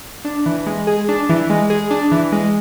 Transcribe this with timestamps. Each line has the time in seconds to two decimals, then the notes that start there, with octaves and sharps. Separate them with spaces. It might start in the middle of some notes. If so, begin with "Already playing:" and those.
0.25 D4
0.46 E3
0.67 G#3
0.87 G#4
1.09 D4
1.29 E3
1.50 G#3
1.70 G#4
1.91 D4
2.12 E3
2.32 G#3